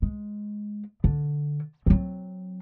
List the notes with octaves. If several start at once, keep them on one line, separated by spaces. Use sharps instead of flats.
G#3
D3
F#3 C4